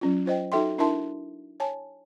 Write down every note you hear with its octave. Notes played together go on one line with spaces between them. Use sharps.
F#3 C#4 F4
F4 C5 D#5 G5
D#4 F#4 A4 E5 G5 C6
D4 E4 A#4 E5 A5 C6
C#5 G#5 A5